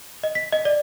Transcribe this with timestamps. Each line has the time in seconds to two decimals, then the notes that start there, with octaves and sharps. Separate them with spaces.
0.24 D#5
0.35 B6
0.53 D#5
0.65 D5